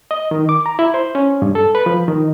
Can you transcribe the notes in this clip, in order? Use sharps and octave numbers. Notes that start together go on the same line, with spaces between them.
D#5
D#3
D6
A#5
E4
C5
C#4
G2
A4
B4
F3
D#3